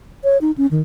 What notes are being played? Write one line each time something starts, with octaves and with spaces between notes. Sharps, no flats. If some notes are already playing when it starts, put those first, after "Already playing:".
C#5
D#4
C#4
D#3